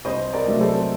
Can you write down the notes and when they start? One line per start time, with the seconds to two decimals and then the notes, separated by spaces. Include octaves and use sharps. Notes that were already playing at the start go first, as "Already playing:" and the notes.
0.05 C2 C5 D#5
0.34 A#4 D5
0.47 C3 F#3 A3
0.61 A4 C5